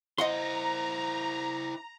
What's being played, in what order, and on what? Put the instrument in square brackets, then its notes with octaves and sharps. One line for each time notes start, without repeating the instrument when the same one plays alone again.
[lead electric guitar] E4 C5 [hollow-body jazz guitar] D#5 F#5 C6 [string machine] A#5